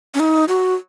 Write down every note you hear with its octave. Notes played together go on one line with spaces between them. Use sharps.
C#4
D#4
F#4